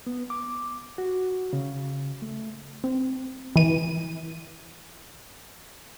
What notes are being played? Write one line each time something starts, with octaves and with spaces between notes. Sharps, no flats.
B3
D6
F#4
C#3
A3
C4
E3 D#7